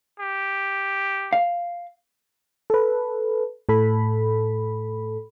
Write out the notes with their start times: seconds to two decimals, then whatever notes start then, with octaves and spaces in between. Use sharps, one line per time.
0.20 G4
1.33 F5
2.70 A4 B4
3.69 A2 A4 B5